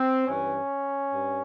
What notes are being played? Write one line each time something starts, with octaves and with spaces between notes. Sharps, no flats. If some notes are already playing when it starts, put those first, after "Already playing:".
Already playing: C4
G2 E3 C#4
G2